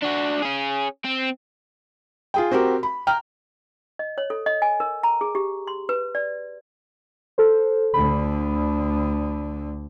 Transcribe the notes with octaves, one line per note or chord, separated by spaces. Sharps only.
D4 F#4
C#4 G#4
C4
F4 G#4 G5
C4 F#4 G4 A#4
B5
G5 A#5 F6
D#5
C#5
A4
D#5
G#5
A#4
A#5
G#4
G4
C6
B4
D5
A4 C5
D2 D3 B5